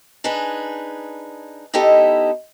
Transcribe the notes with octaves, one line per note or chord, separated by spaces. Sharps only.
D4 D#4 G#4 B4
B3 D#4 E4 G4 A4 D#5